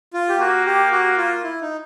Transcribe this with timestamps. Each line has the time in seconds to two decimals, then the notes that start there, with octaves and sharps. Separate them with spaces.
0.13 F4
0.29 G4
0.39 A#3 F#4
0.66 G4
0.92 F#4
1.17 F4
1.44 E4
1.61 D#4